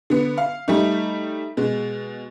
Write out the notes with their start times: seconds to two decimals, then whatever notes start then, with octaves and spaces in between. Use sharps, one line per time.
0.10 D3 B3
0.38 F5
0.68 G3 A3 D#4
1.57 B2 G#3